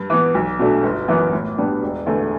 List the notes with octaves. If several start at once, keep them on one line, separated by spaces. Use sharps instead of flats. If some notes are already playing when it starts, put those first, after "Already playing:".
Already playing: G2
E3 B3
B1
B2 A3 D4
G1
F#2 E3 B3
A2
G3 B3 D4
E1
E2 D3 A3